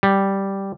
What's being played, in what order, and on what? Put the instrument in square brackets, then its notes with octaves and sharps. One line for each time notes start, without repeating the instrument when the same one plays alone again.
[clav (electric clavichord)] G3